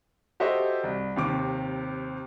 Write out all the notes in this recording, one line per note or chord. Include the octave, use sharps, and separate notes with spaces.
F#4 G4 A4 C5 D#5 E5
C2
D#2 C3 D6